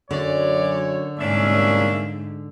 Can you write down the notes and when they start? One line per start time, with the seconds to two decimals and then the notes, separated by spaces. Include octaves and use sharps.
0.11 F#2 D3 C#5 D5
1.19 C2 G#2 A#3 C#4 D4 E5